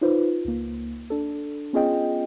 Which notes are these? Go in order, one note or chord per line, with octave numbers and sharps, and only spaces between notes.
D#4 F4 B4 C5
C#2 A#3
D4 A4
B3 C#4 F4 G#4 D#5 G5